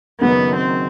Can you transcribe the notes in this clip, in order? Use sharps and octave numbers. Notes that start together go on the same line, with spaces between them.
F#1 F#2 D#3 F#3 B3
C4